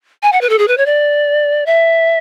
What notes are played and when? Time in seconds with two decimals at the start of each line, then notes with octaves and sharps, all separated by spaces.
0.23 G#5
0.32 F#5
0.41 B4
0.49 A4
0.58 G#4
0.68 B4
0.77 C#5
0.86 D5
1.66 E5